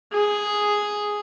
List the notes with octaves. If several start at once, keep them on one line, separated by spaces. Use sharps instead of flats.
G#4